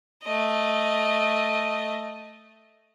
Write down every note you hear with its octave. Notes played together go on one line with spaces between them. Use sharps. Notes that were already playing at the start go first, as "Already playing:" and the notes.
A3 D#5